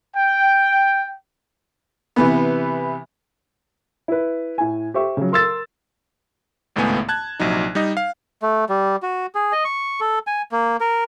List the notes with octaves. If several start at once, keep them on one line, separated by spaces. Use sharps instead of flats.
G5
C3 E3 B3
E4 B4
A2 G#5
G4 C5 E5 C#6
C#3 F#3
A#4 C6 E6 A6
G#1 C#2 A2 A3 B3 G#5
A5 F#6 G#6
A#1 C3 F#3 D#4
G3 D#4 D#5
F5
A3
G3
F#4
G#4
D#5
C#6
A4
G#5
A#3
A#4